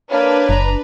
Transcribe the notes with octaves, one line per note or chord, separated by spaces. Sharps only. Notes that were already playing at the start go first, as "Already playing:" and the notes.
A#3 D4 B4 C#5
F#1 A#5